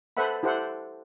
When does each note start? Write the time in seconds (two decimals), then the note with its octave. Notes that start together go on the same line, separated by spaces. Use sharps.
0.17 A4 B4 C5 E5 F#5 B5
0.43 E4 G4 A4 C5 F#5